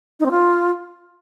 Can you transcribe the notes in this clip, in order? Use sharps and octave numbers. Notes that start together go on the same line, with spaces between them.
D#4
C4
F4